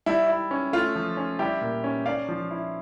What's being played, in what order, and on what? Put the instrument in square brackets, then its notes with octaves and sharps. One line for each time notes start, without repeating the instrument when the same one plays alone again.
[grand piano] G3 E4
E4
C#4
A3 F4
F3
C#4
G3 E4 G4
A#2
C#4
C#4 D5 F5
F3
E4